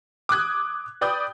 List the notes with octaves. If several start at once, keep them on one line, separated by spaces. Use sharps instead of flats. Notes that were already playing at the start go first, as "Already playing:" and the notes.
D6 D#6 F#6 G#6
B4 D5 G5 D#6 G6